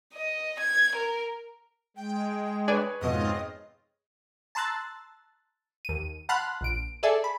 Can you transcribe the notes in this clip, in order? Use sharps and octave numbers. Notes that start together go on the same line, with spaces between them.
D#5
G#6
A#4
G#3 G5
D4 G#4 B4 C#5 D5 G#5
F2 G#2 B2 C4 F4 D#5
A5 A#5 C6 E6 F#6 A6
D#2 D#7
F#5 A5 B5 C6 F6 F#6
A#1 D7
G#4 A4 D5 E5 G#5 A5
B5